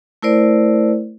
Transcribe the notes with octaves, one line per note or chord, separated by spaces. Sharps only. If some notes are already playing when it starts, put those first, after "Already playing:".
A3 E4 A#4 C5 D5